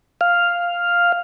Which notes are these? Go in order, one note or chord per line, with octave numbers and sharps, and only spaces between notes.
F5